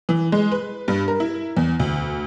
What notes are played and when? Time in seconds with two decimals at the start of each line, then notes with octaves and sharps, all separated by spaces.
0.09 E3
0.32 G#3
0.52 B4
0.88 G2
1.08 A#4
1.20 E4
1.57 E2
1.80 D2